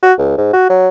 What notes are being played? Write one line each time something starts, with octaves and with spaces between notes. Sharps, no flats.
F#4
C#2
G#2
F#4
F#3